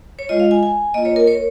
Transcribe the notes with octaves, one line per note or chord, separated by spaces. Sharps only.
C#5
G#3 F4 D#5
F5
G#5
G#5
A#3 F4 D#5
C#5
A#4
C#5